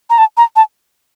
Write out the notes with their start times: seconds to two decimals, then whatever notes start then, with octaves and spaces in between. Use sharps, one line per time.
0.10 A#5
0.18 A5
0.37 A#5
0.56 A5